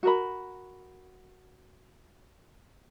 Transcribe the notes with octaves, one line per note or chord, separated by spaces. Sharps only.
F#4 A#4 B5